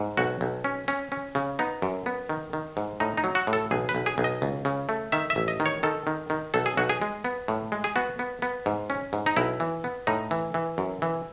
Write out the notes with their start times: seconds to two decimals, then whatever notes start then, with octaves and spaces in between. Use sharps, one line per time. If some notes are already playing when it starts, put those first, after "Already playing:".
Already playing: G#2
0.17 B1 F#4
0.41 B1
0.64 C#4
0.88 C#4
1.12 C#4
1.35 C#3
1.59 B3 D#4
1.82 F#2
2.06 B3
2.29 D#3
2.53 D#3
2.77 G#2
3.00 A2 D#4
3.17 D#4
3.24 F#3
3.35 F#4
3.47 A2
3.53 A4
3.71 B1 G#4
3.89 B4
3.95 B1
4.06 G#4
4.18 B1
4.24 D#5
4.42 C#2
4.65 C#3
4.89 A3
5.12 D#3 E5
5.30 E5
5.36 A1
5.48 D#5
5.60 D#3
5.66 C#5
5.83 D#3 A4
6.07 D#3
6.30 D#3
6.54 B1 A4
6.66 G#4
6.77 B1 F#4
6.89 G#4
7.02 G#3
7.24 B3
7.48 A2
7.72 G#3
7.84 G#4
7.96 B3 F#4
8.19 B3
8.42 B3
8.66 G#2
8.90 C#4
9.13 G#2
9.26 D#4
9.37 B1 E4
9.60 E3
9.84 B3
10.07 A2 D#4
10.31 E3
10.54 E3
10.78 F#2
11.02 E3